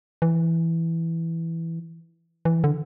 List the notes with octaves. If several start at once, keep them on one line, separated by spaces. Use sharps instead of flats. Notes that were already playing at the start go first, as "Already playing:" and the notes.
E3
E3
D3